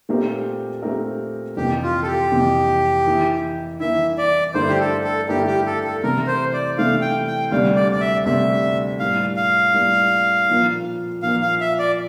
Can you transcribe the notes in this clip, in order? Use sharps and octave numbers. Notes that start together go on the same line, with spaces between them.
A#2 A3 C4 G4 A#4
A#2 A3 C4 G4 A#4
F2 C3 E3 A#3 G4
F4
A4
G4
F2 C3 E3 A#3
E3 A#3 E4
E3 A#3 E4 E5
D5
G2 D3 A3 E4 A#4 C5
G4
A4
A4
G2 D3 A3 E4 G4 A#4
G4
A4
A4
C3 E3 A3 E4 A#4
C5
D5
C3 E3 A3 E4 F5
G5
G5
D2 C3 G3 A#3 D4 F5
D5
D5
E5
D2 C3 G3 A#3 D4 E5
A2 G3 A#3 F5
F5
A2 G3 A#3
A#2 F3 A#3
A#2 F3 A#3 F5
F5
E5
D5